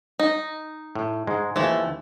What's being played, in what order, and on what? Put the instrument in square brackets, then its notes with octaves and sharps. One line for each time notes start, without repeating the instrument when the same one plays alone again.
[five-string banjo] D#4
[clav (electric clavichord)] A2
G#2 G#3
[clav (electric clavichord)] D#2 E3 [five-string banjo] F3 A3